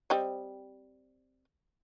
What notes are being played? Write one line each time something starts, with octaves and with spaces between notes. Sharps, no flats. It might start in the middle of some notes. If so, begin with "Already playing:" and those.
G3 C4 D#5